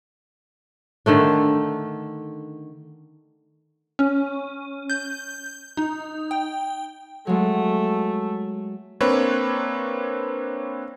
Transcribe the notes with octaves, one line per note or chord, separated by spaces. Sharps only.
D3 D#3 A3 D4
C#4
G6
D#4
G5
F#3 G#3 A3
A#3 C4 D4 B4 C#5